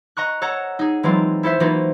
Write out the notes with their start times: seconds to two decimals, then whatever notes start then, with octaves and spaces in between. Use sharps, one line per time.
0.17 D#5 A#5 C#6 F#6
0.42 A4 C#5 F#5 A#5
0.79 D#4 G#4
1.03 E3 F#3 G#3 C4 F4
1.43 E4 A4 C5 E5
1.60 E3 A#3 D#4 F4 F#4